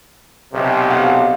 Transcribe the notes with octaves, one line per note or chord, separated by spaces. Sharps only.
B1 C3
F5 F#5